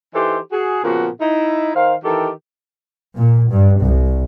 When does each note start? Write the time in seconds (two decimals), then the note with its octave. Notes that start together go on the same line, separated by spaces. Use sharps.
0.15 E3 D#4 G4 A4 C5
0.51 F#4 G#4
0.84 A#2 C#3 F3 B3 F#4
1.20 D#4 E4
1.75 D#3 C5 F5
2.04 D#3 E3 G4 A4
3.17 A#2
3.51 G2
3.82 C2